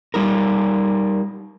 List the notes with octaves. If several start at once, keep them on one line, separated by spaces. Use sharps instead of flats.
G3 D#4 A#4